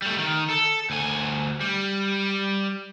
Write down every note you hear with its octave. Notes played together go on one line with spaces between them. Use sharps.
G3 A3
D#3
A4
D2 G#5
G3